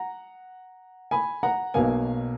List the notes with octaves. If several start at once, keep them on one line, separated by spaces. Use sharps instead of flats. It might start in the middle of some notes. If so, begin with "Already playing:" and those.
Already playing: F#5 A#5
G#5 B5
F#5 A#5
B1 B2 A#3 F5 G#5